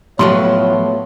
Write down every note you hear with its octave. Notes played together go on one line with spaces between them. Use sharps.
A2 F3 F#3 A3 B3 C#5 C6